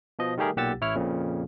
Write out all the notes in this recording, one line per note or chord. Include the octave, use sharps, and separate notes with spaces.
B2 F3 D#5
D#3 G3 A3 G4 G#4 A#4
B1 A#2 G4 F#5 E6 A6
A1 E4 C#5 F6
F2 A#2 C#3